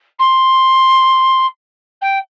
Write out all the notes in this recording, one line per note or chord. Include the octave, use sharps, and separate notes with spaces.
C6
G5